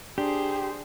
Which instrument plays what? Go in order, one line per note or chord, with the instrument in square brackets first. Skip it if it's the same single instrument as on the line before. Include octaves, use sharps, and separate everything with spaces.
[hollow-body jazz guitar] D4 [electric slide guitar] G4 [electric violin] G#4 C5